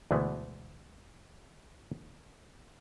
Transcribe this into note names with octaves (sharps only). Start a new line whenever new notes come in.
D2 B2 E3 G#3 A3 B3